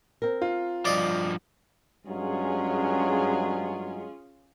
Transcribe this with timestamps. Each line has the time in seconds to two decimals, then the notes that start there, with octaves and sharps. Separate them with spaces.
0.22 C4 A#4
0.42 F4
0.85 G2 F3 D5 D#5
2.07 G2 F#3 G#3 C#4 F4 G#4